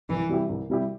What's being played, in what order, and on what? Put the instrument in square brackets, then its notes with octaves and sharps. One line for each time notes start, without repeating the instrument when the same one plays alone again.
[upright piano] C2 [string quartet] E3
[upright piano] C3 G3 E4 G4
C2
C3 G3 E4 G4